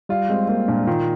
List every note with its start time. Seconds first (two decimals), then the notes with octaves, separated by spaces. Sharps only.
0.09 G3 F4
0.30 G#3 C4
0.48 A#3 C4
0.68 A#2 D4
0.87 D#3 F4